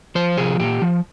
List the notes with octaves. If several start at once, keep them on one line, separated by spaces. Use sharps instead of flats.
F3 C5
C3 G#4
A#2 G4
F3